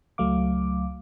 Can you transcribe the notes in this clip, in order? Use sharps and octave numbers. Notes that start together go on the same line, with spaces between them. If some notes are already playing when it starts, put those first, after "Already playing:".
C#2 F#3 A3 F5 D6